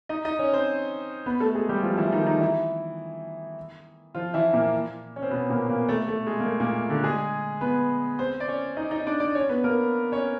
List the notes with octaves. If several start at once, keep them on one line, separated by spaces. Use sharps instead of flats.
D#4 D#5
D#4 D#5
C#4 C#5
C4 C5
B3 B4
A3 A4
G#3 G#4
G3 G4
F3 F4
E3 E4
D#3 D#4
D#3 D#4
E3 E4
F3 F4
E3 E4
A#2 A#3
C#4
C4
B2 B3
A#2 A#3
A#2 A#3
A3
A3
G#3
A#3
A3
A#2 A#3
D3 D4
G#3 G#4
B3 B4
C4 C5
D5
C#4 C#5
D#4 D#5
D#4 D#5
D4 D5
D4 D5
C#4 C#5
B3 B4
A#3 A#4
C#4 C#5